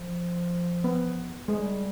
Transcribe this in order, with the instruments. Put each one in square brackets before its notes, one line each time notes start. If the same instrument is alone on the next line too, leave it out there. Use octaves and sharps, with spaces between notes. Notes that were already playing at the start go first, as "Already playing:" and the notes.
Already playing: [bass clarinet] F3
[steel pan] B3
[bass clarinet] G3 [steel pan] G#3